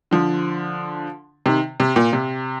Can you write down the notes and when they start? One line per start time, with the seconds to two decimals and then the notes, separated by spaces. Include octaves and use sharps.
0.11 D3 F3
1.46 C3 D#3
1.80 C3
1.96 A#2
2.13 C3